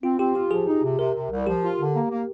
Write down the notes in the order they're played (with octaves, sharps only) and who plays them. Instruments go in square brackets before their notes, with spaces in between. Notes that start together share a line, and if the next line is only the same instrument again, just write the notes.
[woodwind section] C4 [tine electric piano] F4
[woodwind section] C4 [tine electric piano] G4
[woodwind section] F4 [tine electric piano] G4
[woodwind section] F3 [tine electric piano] G#4
[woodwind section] D#4
C3
[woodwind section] C3 [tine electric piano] A#4
[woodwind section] C3
C2
[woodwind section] F3 [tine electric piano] G4
[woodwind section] F4
D3
A#3
A#3